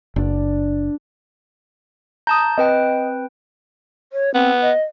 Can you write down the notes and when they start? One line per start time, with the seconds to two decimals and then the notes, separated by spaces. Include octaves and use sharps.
0.16 F#1 D4 D5
2.27 A5 A#5 D#6 G6
2.58 C4 B4 D#5 G5
4.13 C#5
4.34 B3 C4
4.62 D#5